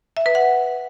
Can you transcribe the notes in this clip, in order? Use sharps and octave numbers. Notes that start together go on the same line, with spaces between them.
E5
B4
F#5